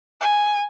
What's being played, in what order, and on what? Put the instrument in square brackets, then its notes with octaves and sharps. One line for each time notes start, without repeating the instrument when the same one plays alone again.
[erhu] G#5